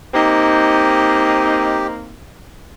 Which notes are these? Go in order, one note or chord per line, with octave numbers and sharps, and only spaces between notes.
A#3 C4 D#4 G4